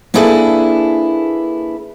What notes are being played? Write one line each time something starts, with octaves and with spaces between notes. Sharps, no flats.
A#3 D4 E4 G#4 A4 B4